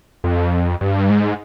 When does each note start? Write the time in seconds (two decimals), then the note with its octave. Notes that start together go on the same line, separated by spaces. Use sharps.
0.24 F2
0.81 G2
1.09 G#2